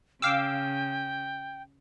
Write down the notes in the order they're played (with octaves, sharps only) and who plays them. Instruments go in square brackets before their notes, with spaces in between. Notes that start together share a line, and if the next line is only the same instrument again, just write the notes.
[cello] C#3 [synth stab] F5 D6 E6 [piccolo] G5